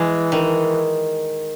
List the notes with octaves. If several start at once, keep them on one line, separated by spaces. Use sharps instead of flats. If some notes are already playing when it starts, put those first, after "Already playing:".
Already playing: E3 G#3
D#3